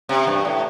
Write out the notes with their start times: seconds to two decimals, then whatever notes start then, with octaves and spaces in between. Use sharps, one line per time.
0.09 C3
0.27 G2
0.45 A2